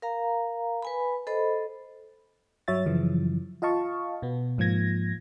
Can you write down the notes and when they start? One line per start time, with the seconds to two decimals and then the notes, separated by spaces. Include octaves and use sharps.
0.02 A#4 F5 A#5
0.82 B4 G#5 B5
1.27 A4 C5 D#5 B5
2.68 G2 F#3 C#5 E5 A6
2.86 F#2 C#3 E3 F3
3.62 F4 D#5 F5 A5 C#6
4.22 B2 B3
4.58 G#2 F3 A#3 G#6 A#6